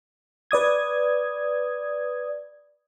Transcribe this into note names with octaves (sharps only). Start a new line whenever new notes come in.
B4 D5 D#6 G#6